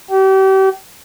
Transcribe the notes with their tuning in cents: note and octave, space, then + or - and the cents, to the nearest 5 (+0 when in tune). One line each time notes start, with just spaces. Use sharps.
G4 -35